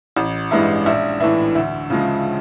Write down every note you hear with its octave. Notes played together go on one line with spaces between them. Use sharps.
A1
G2 E3 G#3 E5
A#1 E5
A2 E3 E5
D2 E5
C#3 F3 G#3